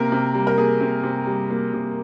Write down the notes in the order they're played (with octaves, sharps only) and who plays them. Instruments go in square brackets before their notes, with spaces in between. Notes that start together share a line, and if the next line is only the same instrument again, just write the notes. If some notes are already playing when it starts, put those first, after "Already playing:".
Already playing: [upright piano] C3 A#3 A#4
C3
G3
A#4
A#3 G#4
C3
C3
G3
A#3
C3